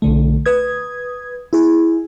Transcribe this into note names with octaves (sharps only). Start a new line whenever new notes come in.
B1 D3 A3
B4 D#6 G#6
E4 G#4